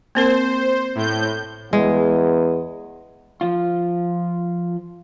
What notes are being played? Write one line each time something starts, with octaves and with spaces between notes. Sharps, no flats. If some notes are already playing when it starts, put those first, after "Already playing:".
A#3 C4 A#4 C5
A2 G6
E2 G#3
F3 F4